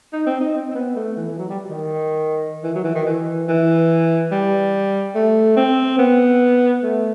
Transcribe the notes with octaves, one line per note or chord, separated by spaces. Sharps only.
D#4
C4
D#4
C4
C4
B3
A3
E3
E3
F#3
G3
D#3
E3
F#3
E3
D#3
E3
E3
G3
A3
C4
B3
A3